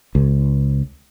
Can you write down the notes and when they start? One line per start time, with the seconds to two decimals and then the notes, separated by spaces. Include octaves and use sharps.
0.15 C#2